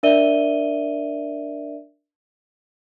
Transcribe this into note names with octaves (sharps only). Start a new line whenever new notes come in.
D4 A#4 D5 E5 D#7 G7